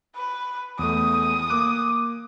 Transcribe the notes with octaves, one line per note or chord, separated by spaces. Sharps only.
B4
E2 A3 D#6
A#3 D6 F#6